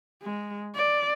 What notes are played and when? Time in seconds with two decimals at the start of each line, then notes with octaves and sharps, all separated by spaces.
0.23 G#3
0.75 D5